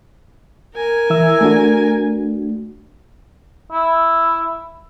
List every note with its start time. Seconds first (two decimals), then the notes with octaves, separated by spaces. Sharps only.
0.75 A#4 G#5
1.10 E3 E5 E6
1.41 A3 D4 F#4
3.72 E4